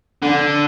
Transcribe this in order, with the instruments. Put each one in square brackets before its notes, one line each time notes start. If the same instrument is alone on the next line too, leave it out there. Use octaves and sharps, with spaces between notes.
[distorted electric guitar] D3